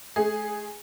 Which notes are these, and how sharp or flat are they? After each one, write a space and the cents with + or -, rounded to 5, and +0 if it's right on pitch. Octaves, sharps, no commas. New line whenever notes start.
A3 -45 G#4 +0